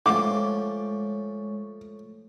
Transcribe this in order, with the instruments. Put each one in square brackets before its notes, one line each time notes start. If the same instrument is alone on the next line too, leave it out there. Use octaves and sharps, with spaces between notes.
[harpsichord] F3 A3 [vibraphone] G#3 C#5 C#6 [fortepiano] D6